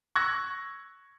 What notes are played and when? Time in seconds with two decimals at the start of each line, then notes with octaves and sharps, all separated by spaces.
0.15 C#6 E6 F#6 G#6 A#6